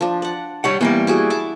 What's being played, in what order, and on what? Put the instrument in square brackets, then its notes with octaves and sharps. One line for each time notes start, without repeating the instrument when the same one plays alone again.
[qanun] F3 D4
D5 F#5
[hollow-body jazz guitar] G3 C#5 F#5
[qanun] E3 G5 [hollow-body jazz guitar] G3 A#3 B3
[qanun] E4 F#4 G#4
E4 A5 D6